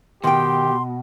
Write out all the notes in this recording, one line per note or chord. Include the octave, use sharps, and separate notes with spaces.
B2 D#3 G4 G5 C6